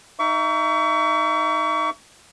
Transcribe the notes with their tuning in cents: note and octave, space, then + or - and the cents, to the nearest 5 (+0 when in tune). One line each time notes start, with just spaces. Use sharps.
D#4 +0 E5 +30 C#6 +35